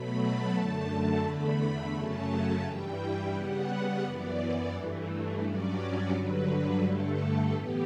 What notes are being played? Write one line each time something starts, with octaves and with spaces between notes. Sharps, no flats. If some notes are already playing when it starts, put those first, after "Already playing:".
Already playing: B2 F#3 A3 B5
A5
F#2 D3 A3 A5
E2 D3 A3 B5
F#2 C#3 F#3 A3 C#4 A5
G2 E3 G3 G5
C#3 G3 B3 F#5
F#2 E3 B3 D5
G2 E3 A3
G2 F#3 C#4 D5
G2 D3 F#3 B4
G2 D3 A3 A4
A2 E3 B3 G4